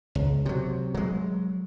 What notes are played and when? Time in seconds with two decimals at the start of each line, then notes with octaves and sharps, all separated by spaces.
0.15 C#2
0.46 C3 F#3
0.95 F#3 G#3